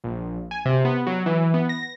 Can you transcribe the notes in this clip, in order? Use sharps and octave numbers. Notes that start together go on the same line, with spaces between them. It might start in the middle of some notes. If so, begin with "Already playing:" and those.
A#1
G#5
C3
B3
F#3
E3
B3
A#6